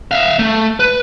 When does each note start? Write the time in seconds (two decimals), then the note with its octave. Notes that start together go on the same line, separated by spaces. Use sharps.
0.11 E5 F5
0.39 A3
0.80 B4